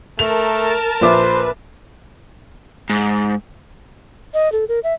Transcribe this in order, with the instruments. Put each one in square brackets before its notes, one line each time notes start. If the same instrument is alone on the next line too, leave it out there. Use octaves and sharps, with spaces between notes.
[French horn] A3 [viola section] A#4 A5 [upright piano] F7
[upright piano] A#1 E5 D6 [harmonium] B4 [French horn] C5
[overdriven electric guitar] G#2
[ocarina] D#5
A4
A#4
E5